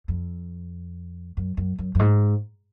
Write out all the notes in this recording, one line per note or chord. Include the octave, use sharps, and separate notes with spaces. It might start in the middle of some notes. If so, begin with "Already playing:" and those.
F2
F#2
F#2
F#2
F#2
G#2